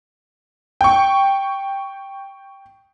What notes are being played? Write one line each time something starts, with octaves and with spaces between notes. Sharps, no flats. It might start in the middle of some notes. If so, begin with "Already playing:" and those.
G5 C#6